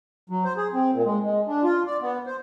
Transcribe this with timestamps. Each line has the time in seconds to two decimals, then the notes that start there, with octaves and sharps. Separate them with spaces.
0.30 F#3
0.45 C5
0.57 G#4
0.74 C4
0.92 A#2
1.05 G#3
1.23 G#3
1.48 D4
1.64 F4
1.87 D5
2.02 B3
2.26 C5